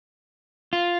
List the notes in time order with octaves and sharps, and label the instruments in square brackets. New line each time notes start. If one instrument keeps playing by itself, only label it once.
[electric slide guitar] F4